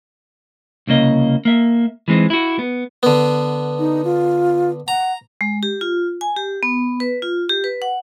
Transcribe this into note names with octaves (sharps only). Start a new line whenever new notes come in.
C2 C#3 A#3 D#5
A#3 E5
E3 G#3 C4 D#4
E4 F#4
B3
D3 B3
D#4
F4
F#5 A#5
G#3
G4
F4
G#5
G4
B3
B4
F4
G4
B4
F#5